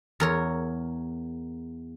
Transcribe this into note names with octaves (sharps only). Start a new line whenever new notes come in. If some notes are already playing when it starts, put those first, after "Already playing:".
E2 A#4 C#5